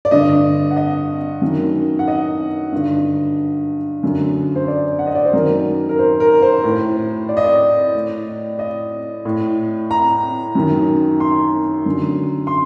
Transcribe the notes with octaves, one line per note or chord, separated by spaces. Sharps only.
D5
G2 D3 D#5
F#5
D#5
F#2 D#3
F#5
D#5
G2 D3
F#2 D3
C5
D5
F#5
D#5
D5
C5
F#2 D#3 A#4
A#4
C5
A#4
C5
A2
D5
D#5
D5
A2
D#5
A2
A#5
F#2 D#3
C6
F#2 D3
C6